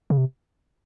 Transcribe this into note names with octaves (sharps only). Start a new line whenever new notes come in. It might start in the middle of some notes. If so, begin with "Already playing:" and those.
C#3
C3